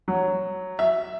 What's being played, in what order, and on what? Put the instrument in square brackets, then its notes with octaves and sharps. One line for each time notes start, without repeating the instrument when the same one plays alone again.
[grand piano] F#3
E5